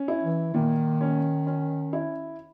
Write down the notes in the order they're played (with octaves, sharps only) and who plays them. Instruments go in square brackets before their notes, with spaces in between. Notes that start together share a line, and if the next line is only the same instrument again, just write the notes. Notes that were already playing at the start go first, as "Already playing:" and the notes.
Already playing: [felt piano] C#4
E4
[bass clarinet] E3
[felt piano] A#2 [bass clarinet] D#3
[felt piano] C#4
C#4
E4